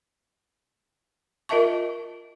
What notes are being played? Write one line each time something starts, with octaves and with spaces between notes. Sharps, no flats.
F4 A#4 D#5 E5 A5 C#6